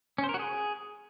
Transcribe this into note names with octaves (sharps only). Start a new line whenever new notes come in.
C#4
C5
A#4
F#4
G#4